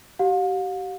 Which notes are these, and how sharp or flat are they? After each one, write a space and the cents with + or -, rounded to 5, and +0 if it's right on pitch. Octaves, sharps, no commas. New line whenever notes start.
G4 -35 F5 +45